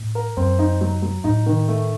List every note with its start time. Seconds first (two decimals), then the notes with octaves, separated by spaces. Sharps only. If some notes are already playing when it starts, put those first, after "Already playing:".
Already playing: A2
0.15 A#4
0.37 F#2 C4
0.59 D#4
0.81 F#3
1.02 F#3
1.24 A2 D#4
1.46 D#3
1.68 A3